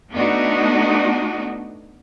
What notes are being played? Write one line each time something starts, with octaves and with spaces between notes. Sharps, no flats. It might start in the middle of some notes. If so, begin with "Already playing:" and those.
A3 B3 D4 D#4 F#4